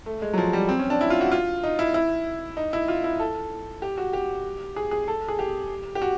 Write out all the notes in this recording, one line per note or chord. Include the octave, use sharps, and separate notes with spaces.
A3
G#3
F#3
F3
G3
C4
C#4
D4
E4
F4
F#4
F4
D#4
E4
E4
D#4
E4
F4
E4
A4
G4
F#4
G4
G#4
G#4
A4
G#4
G4
G4
F#4